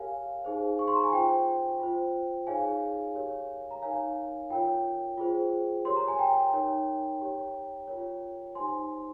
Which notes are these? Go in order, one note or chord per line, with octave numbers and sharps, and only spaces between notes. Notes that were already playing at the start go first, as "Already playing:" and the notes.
Already playing: G4 A#4 C#5 F5 G#5
D#4 G#4 C5
C#6
C6
A#5
G#5
F4 C5 G5
F4 C5
D#4 G#4 C#5 F5 G#5
G4 A#4 C#5
A#5
D#4 A#4 C#5 F5 G#5
F4 A#4 C#5 G5
F4 G#4 C5
G4 A#4 C#5 C6
A#5
G#5
G5 A#5
D#4 A#4 C#5
G4 C#5
F4 A#4 C#5
D#4 G4 C5 G#5 C6